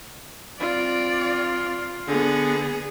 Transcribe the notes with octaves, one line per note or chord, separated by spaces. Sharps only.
C4 F4 D5
D3 B3 G#4